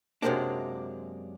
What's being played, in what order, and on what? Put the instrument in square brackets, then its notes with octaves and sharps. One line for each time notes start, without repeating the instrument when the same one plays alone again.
[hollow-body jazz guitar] F#2 C3 E3 G#3 A#3 D4